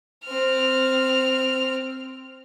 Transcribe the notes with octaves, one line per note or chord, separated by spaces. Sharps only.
C4 F6